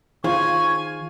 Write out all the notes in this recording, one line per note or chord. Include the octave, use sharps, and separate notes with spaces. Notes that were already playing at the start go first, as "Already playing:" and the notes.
D#3 F4 G#4 C5 G#5 C#6